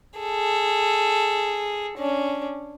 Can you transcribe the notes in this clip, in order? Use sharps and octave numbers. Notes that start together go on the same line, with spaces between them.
G#4 A4
C#4 D4